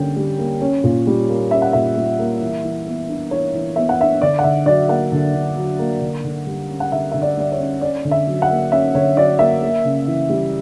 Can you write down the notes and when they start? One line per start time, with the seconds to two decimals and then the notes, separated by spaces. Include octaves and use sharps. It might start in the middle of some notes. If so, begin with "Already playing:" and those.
Already playing: D3 G3 A#3 C#4 G5
0.16 G3
0.38 A#3
0.61 C#4
0.84 A#2
1.07 G3
1.29 A#3
1.51 C#4 E5
1.62 F#5
1.73 A#2 E5
1.96 G3
2.19 A#3
2.41 E3
2.64 E3
2.86 B3
3.09 D4
3.31 E3 C#5
3.54 E3
3.76 B3 E5
3.89 F#5
4.00 D4 E5
4.22 D3 D5
4.39 F#5
4.44 D3 E5
4.66 F#3 D5
4.88 A#3 F#5
5.12 D3
5.34 D3
5.56 F#3
5.79 A#3
6.01 D3
6.24 D3
6.47 G3
6.69 C#4
6.80 F#5
6.92 D3 E5
7.12 D3 E5
7.22 D5
7.37 G3 D5
7.52 C#5
7.59 C#4
7.81 C#4 D5
8.04 D3
8.11 E5
8.27 F#3
8.42 F#5
8.50 A#3
8.71 C#4 E5
8.94 D3 C#5
9.17 F#3 D5
9.39 A#3 E5
9.62 A#3
9.84 C#3
10.07 E3
10.29 G3